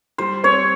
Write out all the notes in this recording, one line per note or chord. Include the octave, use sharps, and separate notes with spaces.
G3 C5
C4 C#5